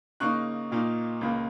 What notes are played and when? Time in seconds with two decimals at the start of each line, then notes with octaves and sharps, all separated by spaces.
0.20 C#3 A#3 D#4 C#6 F#6
0.71 A#2 A#3 D#4
1.21 C#2 C#3 A#3